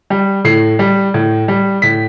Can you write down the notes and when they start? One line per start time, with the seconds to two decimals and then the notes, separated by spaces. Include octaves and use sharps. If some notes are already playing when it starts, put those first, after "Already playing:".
0.10 G3
0.45 A2 C7
0.79 G3
1.14 A2
1.48 G3
1.82 A2 B6